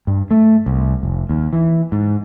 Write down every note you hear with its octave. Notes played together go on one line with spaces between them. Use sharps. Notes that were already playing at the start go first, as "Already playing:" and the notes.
G2
A3
C2
F1
D#2
E3
G#2